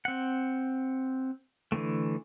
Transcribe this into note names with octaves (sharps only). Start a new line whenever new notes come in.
C4 F#5
D3 E3 A3